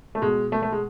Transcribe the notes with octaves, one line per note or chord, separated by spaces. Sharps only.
A3
B2 G#3
A3
A3
G#3